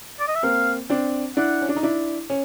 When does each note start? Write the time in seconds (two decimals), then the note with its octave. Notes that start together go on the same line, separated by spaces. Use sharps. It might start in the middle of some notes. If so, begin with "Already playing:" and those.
0.20 D5
0.28 D#5
0.35 E5
0.43 A#3 C4 F5
0.90 C4 D4
1.37 D4 E4 F#5
1.62 C#4
1.69 D4
1.76 D#4
1.83 D4 E4
2.30 C#4